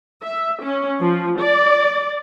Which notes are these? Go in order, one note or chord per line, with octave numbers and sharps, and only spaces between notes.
E5
C#4
F3
D5